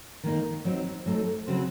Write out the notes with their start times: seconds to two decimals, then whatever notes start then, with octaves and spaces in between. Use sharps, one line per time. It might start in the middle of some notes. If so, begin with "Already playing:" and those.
0.24 D#3 A#3 D#4
0.65 F#3 C4 D#4
1.06 F#3 A3 C4 D#4 A4
1.47 C#3 F#3 C4 F#4 C5